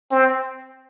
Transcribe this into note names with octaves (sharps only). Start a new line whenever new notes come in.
C4